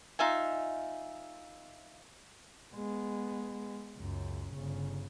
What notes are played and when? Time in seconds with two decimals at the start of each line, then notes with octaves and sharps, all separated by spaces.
0.19 D#4 F4 E5 G#5
2.74 G#3 B3
3.97 C#2 F#2
4.53 G1 C#3